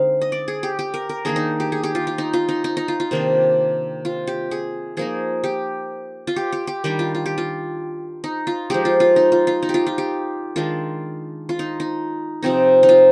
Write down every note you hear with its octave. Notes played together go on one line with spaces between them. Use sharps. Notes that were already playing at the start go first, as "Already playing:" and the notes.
Already playing: D3 G#3 C4 D#4 F5
D#5
D5
G#4
G4
G4
A#4
A#4
D#3 A#3 D4 G#4
D#4
G4
G#4
G4
F4
F4
D#4
F4
D#4
D#4
D#4
F4
F4
C3 D#3 A#3 D4
F4
G4
G#4
F3 A#3 D#4 G#4
G4
F4
G4
G4
G4
D#3 G3 D4 G4
F4
F4
G4
F4
D#4
F4
F3 G#3 D#4 G4
F4
F4
D#4
F4
F4
D#4
G4
F4
F4
G4
D#3 G#3 D4 F4
F4
D#4
D#4
C3 F3 C4 D#4
D#4
F4